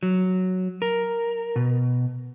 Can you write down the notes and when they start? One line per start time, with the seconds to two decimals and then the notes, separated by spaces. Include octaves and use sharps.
0.03 F#3
0.82 A#4
1.56 B2